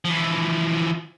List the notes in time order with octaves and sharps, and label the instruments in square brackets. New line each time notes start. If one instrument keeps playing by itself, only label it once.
[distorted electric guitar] E3 F3